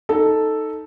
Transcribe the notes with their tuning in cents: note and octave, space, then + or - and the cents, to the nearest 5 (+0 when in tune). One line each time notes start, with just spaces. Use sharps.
D#4 +0 A4 +0